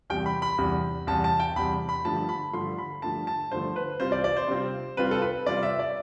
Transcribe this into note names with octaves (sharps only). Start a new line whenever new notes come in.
E2 C3 G3 G5
B5
B5
E2 C3 G3
E2 C3 G3 A5
A5
G5
E2 C3 G3 B5
B5
G2 D3 F3 A3 A5
B5
G2 D3 F3 A3 C6
B5
G2 D3 F3 A3 A5
A5
G2 D3 F3 A3 C5
B4
C3 G3 C4 F4 C5
D5
D5
C5
C3 G3 C4 F4
C3 G3 C4 F4 B4
A4
B4
C3 G3 C4 F4 D5
E5
D5